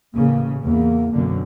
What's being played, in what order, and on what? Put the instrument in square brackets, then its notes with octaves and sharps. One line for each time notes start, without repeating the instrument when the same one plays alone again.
[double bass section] A1 C#3 [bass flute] A#3
[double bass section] E2 [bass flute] A#3
[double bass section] B1 F#2 D3